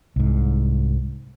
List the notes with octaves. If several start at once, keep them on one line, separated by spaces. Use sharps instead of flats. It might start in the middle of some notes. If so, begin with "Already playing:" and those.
C2 G#2